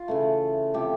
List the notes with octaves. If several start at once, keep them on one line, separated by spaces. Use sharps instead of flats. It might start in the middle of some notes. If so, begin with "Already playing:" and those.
Already playing: F4
C#3 E3 A3
C3 F3 A3 G4